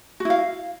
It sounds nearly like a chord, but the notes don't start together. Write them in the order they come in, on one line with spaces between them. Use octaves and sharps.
F#4 E4 F5